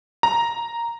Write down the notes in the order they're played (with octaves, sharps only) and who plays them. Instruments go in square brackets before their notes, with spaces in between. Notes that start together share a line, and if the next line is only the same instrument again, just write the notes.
[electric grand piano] A#5